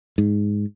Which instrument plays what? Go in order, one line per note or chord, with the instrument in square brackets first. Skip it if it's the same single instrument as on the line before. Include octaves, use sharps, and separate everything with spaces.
[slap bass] G#2